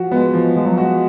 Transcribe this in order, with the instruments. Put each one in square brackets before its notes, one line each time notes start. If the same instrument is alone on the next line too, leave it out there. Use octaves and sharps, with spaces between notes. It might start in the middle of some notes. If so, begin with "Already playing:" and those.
Already playing: [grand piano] F3 F#4
[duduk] G#3 [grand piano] B3
[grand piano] F3
[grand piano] F3 [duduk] G#3
[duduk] F#3
[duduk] G#3 [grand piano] F#4